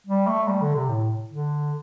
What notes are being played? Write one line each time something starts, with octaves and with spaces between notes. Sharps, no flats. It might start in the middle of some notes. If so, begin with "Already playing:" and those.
G3
A3
G3
D3
C3
A2
D3